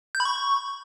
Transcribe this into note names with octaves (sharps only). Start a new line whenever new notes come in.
G6
B5
C#6